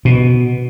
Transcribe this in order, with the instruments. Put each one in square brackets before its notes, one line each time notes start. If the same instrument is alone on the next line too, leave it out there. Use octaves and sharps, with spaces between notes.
[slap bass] B2